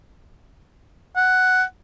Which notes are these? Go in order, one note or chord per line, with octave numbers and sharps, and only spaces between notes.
F#5